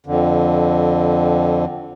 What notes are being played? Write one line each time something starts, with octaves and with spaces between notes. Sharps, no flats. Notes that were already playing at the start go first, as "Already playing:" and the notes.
F2 D3